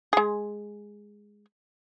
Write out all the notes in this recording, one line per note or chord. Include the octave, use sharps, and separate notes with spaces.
G#3 G#4